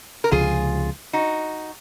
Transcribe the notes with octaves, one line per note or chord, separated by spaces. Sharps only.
A#4
C#2 C3 F3 G#3 F4 G#4
D#4 F#4